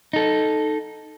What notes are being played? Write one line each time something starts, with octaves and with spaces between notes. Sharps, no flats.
D#4 A4